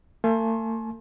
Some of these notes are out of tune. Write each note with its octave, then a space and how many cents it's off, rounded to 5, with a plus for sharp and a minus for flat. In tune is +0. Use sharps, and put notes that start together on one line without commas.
A3 +45 G#5 +40 C6 +35